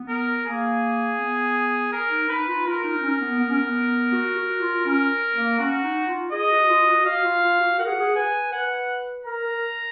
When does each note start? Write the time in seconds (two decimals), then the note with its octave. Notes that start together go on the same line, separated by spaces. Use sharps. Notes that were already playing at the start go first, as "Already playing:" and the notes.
Already playing: B3
0.09 A#4
0.46 A#3 G#4
1.19 B3
1.93 A#4
2.10 D#4
2.29 D#4 B4
2.47 F4
2.66 F4 A#4
2.84 D#4
2.98 D#4
3.03 C#4
3.21 B3
3.39 B3
3.50 C#4
3.60 B3
4.13 F#4
4.37 F#4
4.61 F4
4.85 C#4 A#4
5.34 A#3
5.59 C#4 F#4
5.84 D#4
6.08 F4
6.32 G#4 D#5
6.50 F#4
6.69 F4
6.87 F#4
7.05 F#4 F5
7.24 F4
7.42 F4
7.60 F#4
7.79 A#4 F#5
7.86 G#4
7.92 F#4
8.00 G#4
8.15 B4 G#5
8.52 B4 F#5
9.26 A#4 A#5
9.44 A#4